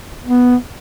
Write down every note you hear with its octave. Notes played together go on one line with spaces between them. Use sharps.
B3